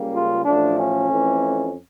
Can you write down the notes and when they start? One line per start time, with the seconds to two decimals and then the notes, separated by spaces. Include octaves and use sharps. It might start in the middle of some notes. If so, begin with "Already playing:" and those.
Already playing: C#2 C#3 G3 A#3
0.14 F4
0.45 A1 A2 F3 A3 D4
0.78 C#4
1.09 F2 E3 A3